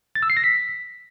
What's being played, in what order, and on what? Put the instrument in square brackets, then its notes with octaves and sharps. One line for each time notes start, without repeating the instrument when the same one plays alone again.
[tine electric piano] A6
E6
C7
A#6
B6